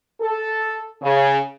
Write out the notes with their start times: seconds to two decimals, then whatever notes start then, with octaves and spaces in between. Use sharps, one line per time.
0.20 A4
1.01 C#3